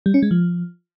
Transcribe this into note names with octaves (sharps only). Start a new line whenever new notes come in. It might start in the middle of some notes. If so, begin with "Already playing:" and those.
G3
C#4
G#3
F3